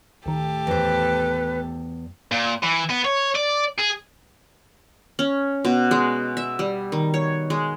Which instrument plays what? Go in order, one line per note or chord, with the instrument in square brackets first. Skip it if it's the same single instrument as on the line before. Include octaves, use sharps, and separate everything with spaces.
[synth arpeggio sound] D2 D#3 [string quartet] A2 G4 A4
[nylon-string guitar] E2 C5 [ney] B4
[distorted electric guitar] A#2
E3
B3
C#5
D5
G#4
[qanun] C#4
B2
G#3
E5
G3
D#3
C#5
G#3